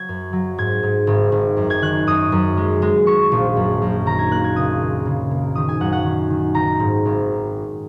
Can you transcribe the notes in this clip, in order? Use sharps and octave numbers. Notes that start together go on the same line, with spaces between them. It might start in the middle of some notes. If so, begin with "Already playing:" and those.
Already playing: F#3 G#6
F#2
F#3
G#2 G#6
G#2
G#1
G#1
F#2
G#6
D#3 F#6
F#2 D#6
F#2
G#3
G#3
G#3 C#6
A#1
F#2
F#2
D#3 A#5
G#6
A#3 F#6
G#6
C#2 D#6
A#3
C#3
A#3
D#3 D#6
G#5
F#2 F#5
F#5
D#3
D#3
D#3 A#5
G#2
G#1